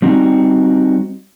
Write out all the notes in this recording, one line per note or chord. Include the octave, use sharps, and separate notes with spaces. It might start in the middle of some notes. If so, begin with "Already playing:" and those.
G3 C4 D#4 F#4